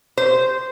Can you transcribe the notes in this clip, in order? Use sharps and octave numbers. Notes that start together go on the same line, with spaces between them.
C5